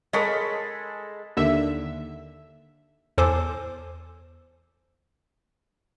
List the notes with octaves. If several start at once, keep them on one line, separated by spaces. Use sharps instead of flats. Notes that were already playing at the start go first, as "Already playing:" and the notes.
G#3 A4 A#4 C#5 D#5 B5
D#2 D3 E5
E2 A4 C5 G#5 D6